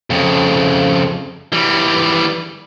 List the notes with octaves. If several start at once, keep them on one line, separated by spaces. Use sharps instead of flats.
F2 C#3
E3 G3